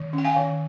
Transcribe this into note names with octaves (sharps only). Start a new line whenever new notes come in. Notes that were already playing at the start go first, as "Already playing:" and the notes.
Already playing: D#3
C#4
G5
F5 G#5
D#3